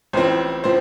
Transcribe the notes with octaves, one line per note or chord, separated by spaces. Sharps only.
A1 A2 F3 C4 C5
A2 F3 C5